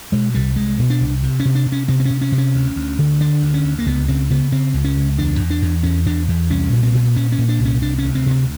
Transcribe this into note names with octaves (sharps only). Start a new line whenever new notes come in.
B2 G#3
C2 G3
C2 G#3
B2
D4
C2
C3
C#4
C3
D4
C3
C#4
C3 C4
C4
C3 C#4
C#4
C3
C#4
D2
D2
D3
D3 D4
D2
C#4
D2
A#3
C#2 B3
C#3 C4
C#3 B3
C#3 C4
C#2
C#4
C#2
E2 D4
E2
D4
E2
E2 C#4
E2 D4
E2
C2 C#4
A#2
C4
A#2
A#2 C#4
C#4
A#2
D4
C2
C#4
C3 D4
C#4
D2
C4
C3 C4